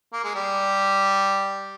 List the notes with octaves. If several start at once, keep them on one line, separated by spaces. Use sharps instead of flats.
A#3
G#3
G3